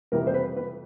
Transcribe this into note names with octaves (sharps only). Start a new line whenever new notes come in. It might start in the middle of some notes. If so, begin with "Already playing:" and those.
F2 C3 E3 G3 A#4
C5
B4
B4